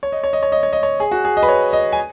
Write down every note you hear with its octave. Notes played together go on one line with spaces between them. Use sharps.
C#5
D#5
C#5
D#5
C#5
D#5
C#5
D#5
C#5
G#4
F#4
G#4
D#5
B4
C#5
D#5
G#5